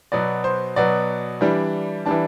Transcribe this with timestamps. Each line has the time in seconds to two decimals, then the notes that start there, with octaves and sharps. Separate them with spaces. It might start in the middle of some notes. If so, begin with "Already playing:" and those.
0.12 B2 F#3 B3 D5
0.44 C5
0.76 B2 F#3 B3 D5
1.41 E3 G3 D4
2.06 E3 G3 D4 A5